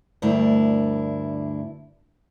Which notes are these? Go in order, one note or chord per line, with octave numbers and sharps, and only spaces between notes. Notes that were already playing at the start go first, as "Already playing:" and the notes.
D2 G2 D4 E4 A#4